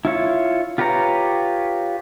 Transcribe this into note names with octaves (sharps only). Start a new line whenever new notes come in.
E4 F4 C#5
F4 G4 B4 C#5 A#5